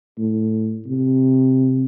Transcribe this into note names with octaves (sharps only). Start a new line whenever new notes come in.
A2
C3